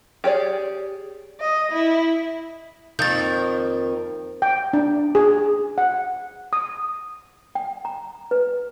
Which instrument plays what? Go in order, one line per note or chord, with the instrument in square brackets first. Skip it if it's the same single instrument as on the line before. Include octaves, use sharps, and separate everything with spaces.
[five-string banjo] G4 G#4 C#5 D5
[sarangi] D#5
E4
[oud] F2 D#3 A#3 [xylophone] G6 A6
[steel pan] G5
D4
G#4
F#5
D#6
[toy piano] G5
A#5
B4